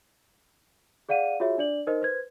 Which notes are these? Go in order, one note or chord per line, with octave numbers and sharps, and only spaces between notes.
G#4 D5 F5 F#5 D#7
F4 F#4 G#4 C#5 E5
D4 D5 F#7
D#4 A#4 C5 D#5
B4 C5 G#6